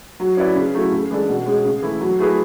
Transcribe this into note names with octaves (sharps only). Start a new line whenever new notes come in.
F#3
C#4 E4 B4 D5
C#3
F#3 A3 E4
C#3
E3 G#3 D4 A4
B2
G#3 C#4 G#4
C#3
E3 A3 E4
F#3
A3 E4 G#4 B4